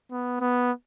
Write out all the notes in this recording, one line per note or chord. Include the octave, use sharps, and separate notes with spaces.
B3
B3